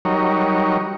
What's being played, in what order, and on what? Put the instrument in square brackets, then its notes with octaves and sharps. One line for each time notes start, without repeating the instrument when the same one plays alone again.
[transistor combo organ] F#3 G3 D#4 A#4 C#5